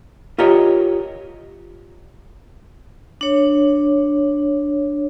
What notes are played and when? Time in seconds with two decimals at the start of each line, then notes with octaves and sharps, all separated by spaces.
0.38 F4 G4 A#4 C#5 D#5
3.21 D4 C#5